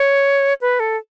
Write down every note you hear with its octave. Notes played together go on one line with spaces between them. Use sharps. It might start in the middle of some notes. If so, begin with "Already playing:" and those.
Already playing: C#5
B4
A4